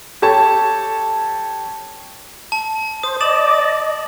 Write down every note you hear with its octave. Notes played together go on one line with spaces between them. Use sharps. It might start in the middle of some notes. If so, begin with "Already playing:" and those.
G4 A4 C#5 A5
A5
C5 D#6
D5 D#5 A6 E7 F#7